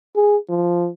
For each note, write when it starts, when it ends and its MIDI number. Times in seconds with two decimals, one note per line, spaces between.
0.15 0.37 68
0.49 0.89 53